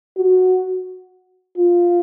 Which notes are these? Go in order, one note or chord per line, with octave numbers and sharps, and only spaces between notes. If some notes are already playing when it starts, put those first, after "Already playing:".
F#4
F4